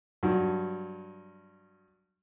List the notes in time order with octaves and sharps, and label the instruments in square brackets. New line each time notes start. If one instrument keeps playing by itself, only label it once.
[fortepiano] G2 F#3